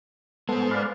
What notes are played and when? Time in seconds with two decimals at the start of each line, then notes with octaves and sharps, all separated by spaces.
0.49 G#3 B3 A4 C5
0.71 B4 D5 F5